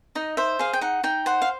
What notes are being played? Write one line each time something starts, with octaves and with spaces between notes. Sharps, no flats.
D#4 D#5
C5 E5
G#4 F5
G5
D#4 F#5
D#4 G5
C5 F#5
F5